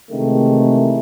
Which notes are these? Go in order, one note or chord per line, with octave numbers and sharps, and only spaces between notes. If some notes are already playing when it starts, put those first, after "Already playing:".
C3 D#3 E3 G#3 A3